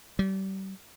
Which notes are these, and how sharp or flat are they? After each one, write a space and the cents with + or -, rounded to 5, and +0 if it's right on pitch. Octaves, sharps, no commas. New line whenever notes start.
G3 -35